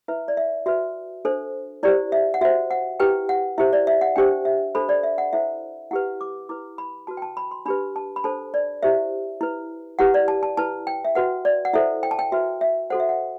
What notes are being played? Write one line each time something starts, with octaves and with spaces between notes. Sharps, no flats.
E4 B4 E5
D5
E5
F#4 B4 E5
D4 A4 C5
E4 G4 C5 D5
E5
F#5
F#4 C5 E5
F#5
E4 G4 B4 G5
F#5
E4 G4 C5 E5
D5
E5
F#5
D4 G4 C5 G5
E5
D4 A4 C5 B5
D5
E5
F#5
E4 A4 C5 E5
E4 G4 B4 F#5
D6
E4 B4 D6
B5
F#4 B4 A5
G5
A5
B5
C6
D4 G4 B4 B5
A5
B5
D4 A4 C5 A5
D5
E4 G4 C5 E5
E4 B4
E4 G4 B4 F#5
D5
A5
A5
E4 B4 A5
G5
E5
F#4 B4 F#5
D5
F#5
E4 A4 C5 E5
G5
A5
G5
F#4 B4 E5
E5
F#4 A4 C5 F#5
E5
F#5